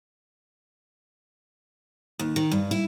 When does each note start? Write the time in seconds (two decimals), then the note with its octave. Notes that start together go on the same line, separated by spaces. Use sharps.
2.19 D#2
2.36 D#3
2.51 G2
2.71 E4